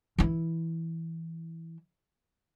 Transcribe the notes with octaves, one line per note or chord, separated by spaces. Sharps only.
E3 E4